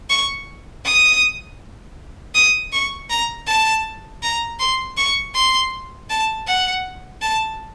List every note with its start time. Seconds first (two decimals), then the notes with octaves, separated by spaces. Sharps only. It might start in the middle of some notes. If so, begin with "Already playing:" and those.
0.10 C#6
0.84 D#6
2.35 D#6
2.72 C#6
3.10 A#5
3.47 A5
4.22 A#5
4.59 C6
4.97 C#6
5.34 C6
6.10 A5
6.47 F#5
7.22 A5